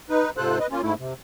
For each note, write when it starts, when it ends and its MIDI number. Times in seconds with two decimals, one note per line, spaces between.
0.09 0.30 63
0.09 0.30 71
0.37 0.59 44
0.37 0.59 48
0.37 0.59 65
0.37 0.59 69
0.37 0.59 72
0.37 0.59 90
0.59 0.67 71
0.59 0.67 75
0.71 0.81 58
0.71 0.81 61
0.71 0.81 65
0.83 0.94 44
0.83 0.94 57
0.83 0.94 64
0.99 1.13 48